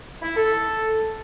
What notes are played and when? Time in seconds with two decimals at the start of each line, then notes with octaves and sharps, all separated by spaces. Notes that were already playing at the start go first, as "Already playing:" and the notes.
0.22 E4
0.36 A4